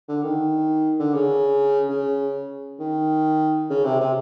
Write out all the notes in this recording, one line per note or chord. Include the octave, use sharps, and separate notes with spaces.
D3
D#3
D3
C#3
C#3
D#3
C#3
C3
C3